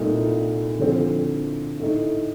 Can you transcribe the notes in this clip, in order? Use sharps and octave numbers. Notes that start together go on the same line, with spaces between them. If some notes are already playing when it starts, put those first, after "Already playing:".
Already playing: C2 A#2 A3 D#4
D3 F3 C4
A2 A3 D#4